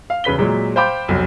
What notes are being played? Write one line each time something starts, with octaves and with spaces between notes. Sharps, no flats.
F5
E1 C#3 B4 B6 G7
A#2 F#3 G#3
C5 F5 G5 B5 D6 G6
F1 B1